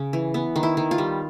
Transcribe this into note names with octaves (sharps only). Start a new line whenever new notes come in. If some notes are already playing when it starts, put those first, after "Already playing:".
Already playing: C#3
E3
B3
D#3
E4
D#3
F4
G3